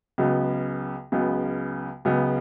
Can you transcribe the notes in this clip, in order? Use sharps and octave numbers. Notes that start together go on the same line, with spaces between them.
C#2 C#3 F#3 B3
C#2 C#3 F#3 B3
C#2 C#3 F#3 B3